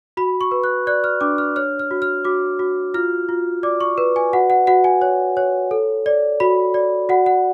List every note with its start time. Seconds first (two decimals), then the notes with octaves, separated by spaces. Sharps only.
0.17 F#4 B5
0.41 C#6
0.51 B4
0.64 F#6
0.87 D5 F#6
1.04 F6
1.21 D4 D6
1.38 F6
1.56 C#5 F6
1.79 F6
1.91 F#4
2.02 F6
2.25 F#4 D6
2.59 F#4
2.94 F4 F6
3.29 F4
3.63 D5 D6
3.81 C#6
3.98 B4
4.16 G#5
4.33 F#4 F#5
4.50 F#5
4.67 F#4 F#5
4.84 G#5
5.02 C#5
5.37 C#5
5.71 A4
6.06 D5
6.40 F#4 B5
6.74 D5
7.09 F#4 F#5
7.26 F#5